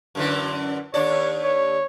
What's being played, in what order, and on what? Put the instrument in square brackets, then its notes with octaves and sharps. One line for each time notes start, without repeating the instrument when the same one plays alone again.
[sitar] F#2 D3 E3
[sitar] D#2 D4 D5 [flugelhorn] C#5
[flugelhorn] C#5